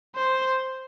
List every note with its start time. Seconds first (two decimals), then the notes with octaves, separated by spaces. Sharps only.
0.16 C5